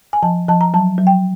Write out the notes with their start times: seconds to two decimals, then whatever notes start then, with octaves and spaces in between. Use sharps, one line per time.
0.13 G#5
0.23 F3 A5
0.48 F3 A5
0.61 A#5
0.74 F#3 A5
0.98 F#3
1.07 G5